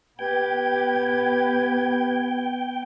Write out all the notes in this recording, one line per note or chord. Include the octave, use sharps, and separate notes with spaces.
B3 G4 B4 G5 G#6